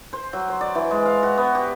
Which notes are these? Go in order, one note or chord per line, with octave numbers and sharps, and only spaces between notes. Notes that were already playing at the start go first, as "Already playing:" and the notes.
C5
F#3
C5
D5
E3
G#3
F5
F#4
B3
G4